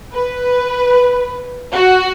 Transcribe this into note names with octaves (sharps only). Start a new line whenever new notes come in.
B4
F#4